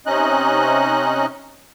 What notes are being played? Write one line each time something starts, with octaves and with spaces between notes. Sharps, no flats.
C3 C#4 D#4 D#5 F#6